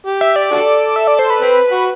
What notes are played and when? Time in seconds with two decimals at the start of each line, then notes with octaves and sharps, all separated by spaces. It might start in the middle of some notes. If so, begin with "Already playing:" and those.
0.06 G4
0.21 E5
0.36 D5
0.51 D4 F#4 A4
0.96 E5
1.07 D5
1.19 C5
1.30 B4
1.42 C4
1.72 F#4